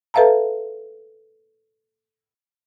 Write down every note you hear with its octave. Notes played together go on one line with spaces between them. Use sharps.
A4 B4 E5 F5 A5 A#5